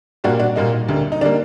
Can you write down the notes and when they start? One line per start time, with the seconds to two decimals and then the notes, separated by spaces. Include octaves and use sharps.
0.24 A#2 G3 A#3 D4 F#4
0.39 D4 F#4
0.56 A#2 G3 A#3 D#4
0.88 D2 D3 G3 A#3
1.12 D#4
1.21 D3 G3 A#3 D4